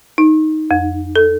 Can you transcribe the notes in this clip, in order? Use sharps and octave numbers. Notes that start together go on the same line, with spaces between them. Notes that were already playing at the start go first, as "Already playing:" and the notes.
D#4
F2
A4